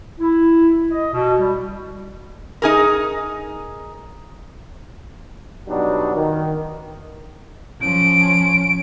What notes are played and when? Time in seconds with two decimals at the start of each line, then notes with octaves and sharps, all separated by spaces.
0.19 E4
0.90 D#5
1.13 B2
1.39 G3
2.62 D#4 G#4 A#4
5.69 B2 F#3 G3 D4 D#4 F#4
6.16 D#3
7.81 F3 C#4 D7